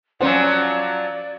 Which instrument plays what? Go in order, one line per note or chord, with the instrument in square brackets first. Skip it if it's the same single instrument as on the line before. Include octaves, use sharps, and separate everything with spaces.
[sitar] F3 F#3 [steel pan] C#4 C5 F#5 [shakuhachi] D5